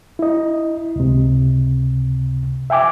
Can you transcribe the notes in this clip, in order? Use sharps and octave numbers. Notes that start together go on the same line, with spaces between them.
E4 D#5
C#2 C3
E5 G5 G#5 D6